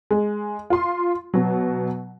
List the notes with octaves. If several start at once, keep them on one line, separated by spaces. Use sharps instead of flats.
G#3
F4 C6
B2 F#3